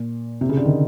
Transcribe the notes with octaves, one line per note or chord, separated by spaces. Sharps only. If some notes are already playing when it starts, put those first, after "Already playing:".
Already playing: A#2
C3
C#3
D3
D#3